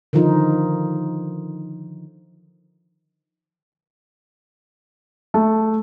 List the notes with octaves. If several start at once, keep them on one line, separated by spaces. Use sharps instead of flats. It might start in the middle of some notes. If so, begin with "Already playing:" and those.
D3 D#3 F3 D#4 F4
A3